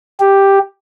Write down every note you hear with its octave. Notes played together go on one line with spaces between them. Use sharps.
G4